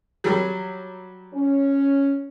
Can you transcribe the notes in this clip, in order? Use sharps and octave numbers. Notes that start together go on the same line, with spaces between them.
F#3 G3
C#4